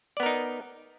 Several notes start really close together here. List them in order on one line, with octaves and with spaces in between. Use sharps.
D5 B3 A#4 D#4